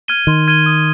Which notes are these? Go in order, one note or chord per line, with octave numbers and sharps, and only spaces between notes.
F6 G#6 D#7 G7
D#3 C6
F6 G#6 D#7 G7
D#6